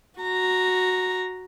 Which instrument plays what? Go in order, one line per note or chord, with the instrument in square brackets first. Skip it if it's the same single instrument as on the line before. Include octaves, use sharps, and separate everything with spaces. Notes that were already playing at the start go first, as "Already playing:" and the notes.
[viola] F#4 A#5